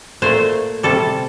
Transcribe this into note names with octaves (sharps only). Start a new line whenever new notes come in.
A#2 A3 C5
C3 G3 A4